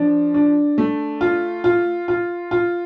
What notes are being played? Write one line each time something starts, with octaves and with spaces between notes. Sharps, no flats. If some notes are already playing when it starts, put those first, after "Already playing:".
Already playing: F3 D4
D4
A3
F4
F4
F4
F4